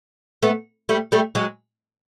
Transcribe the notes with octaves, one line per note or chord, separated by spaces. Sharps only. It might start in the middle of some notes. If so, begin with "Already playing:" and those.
A3 B3
G3 A3
G3 A3
F#3 G#3